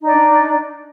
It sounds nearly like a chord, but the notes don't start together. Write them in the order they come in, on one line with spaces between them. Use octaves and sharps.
D#4 D5 D4